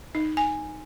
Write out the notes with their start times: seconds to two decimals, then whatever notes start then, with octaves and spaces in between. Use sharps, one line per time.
0.15 D#4
0.37 G#5